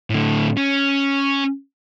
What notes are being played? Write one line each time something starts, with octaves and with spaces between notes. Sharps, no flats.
A2 D3
C#4